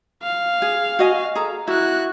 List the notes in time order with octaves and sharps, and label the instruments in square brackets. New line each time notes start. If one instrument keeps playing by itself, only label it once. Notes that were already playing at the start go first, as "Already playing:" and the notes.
[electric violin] F5
[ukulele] G#4
F#4 D#5 G#5
G#4 A4 A#5
[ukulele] E4 [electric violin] F#4 F#6